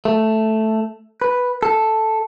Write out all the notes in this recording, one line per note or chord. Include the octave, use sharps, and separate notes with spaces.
A3
B4
A4